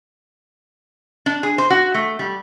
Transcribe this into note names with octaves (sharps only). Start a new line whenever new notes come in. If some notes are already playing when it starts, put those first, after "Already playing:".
D4
G#4
C5
F#4
A3
G3